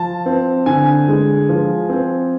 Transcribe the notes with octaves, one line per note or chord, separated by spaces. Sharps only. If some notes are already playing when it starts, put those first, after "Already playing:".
Already playing: F3 A5
C4
D3 G#5
G#3
F3
C4